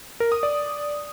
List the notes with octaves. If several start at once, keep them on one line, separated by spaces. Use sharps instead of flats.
A#4
D#6
D5